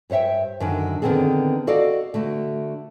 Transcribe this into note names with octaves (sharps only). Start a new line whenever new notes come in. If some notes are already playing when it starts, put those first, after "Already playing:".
G2 C5 C#5 E5 G5
F#2 D3 D#3 D4 D#4
D3 D#3 B3 C4 D4 G#4
F#4 A4 D5 D#5 F5
D3 A3 F#4